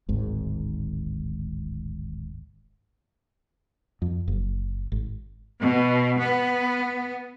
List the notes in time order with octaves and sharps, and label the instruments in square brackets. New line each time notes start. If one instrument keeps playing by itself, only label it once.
[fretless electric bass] D1 G#1 G#2
F2
F#1
G#1
[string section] B2
B3